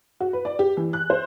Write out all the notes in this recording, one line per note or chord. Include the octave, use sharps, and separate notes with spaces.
F#4
B4
D5
G4
E3
F#6
C5